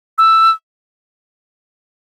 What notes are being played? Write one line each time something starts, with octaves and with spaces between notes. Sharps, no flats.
E6